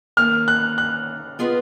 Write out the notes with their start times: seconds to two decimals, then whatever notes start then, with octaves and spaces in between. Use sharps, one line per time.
0.17 D#3 A#3 C#4 F6
0.48 F#6
0.78 F#6
1.39 B3 F4 G#4 B4 D#5